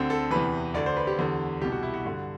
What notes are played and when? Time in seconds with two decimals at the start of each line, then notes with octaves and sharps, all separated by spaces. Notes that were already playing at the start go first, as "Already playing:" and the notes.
Already playing: D2 D3 C4
0.10 A4
0.31 E2 C3 E3 B4
0.74 D2 D3 D5
0.86 C5
0.97 B4
1.07 G4
1.18 E2 D3
1.61 C2 B2 G4
1.72 F#4
1.83 E4
1.94 F#4
2.05 G2 D3